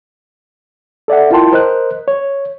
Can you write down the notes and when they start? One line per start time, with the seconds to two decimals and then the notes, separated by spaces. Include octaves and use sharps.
1.08 A4 D5 E5 F#5
1.31 E4 F4 A#4 G5 A5 C6
1.52 A#4 C5 D#5 F#6
2.08 C#5